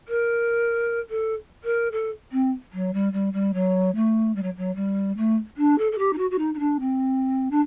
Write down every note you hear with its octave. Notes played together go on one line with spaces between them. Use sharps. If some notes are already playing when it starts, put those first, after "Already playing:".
A#4
A4
A#4
A4
C4
F#3
G3
G3
G3
F#3
A3
G3
F#3
F#3
G3
A3
D4
A4
A4
G4
D#4
F#4
F#4
D#4
D#4
D4
C4
D4